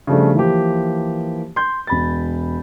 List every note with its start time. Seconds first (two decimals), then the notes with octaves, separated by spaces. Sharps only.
0.07 C#3 F3 G3 A3 D4
0.35 E3 F3 A#3 G4
1.56 C6 G6
1.87 E1 B5 A6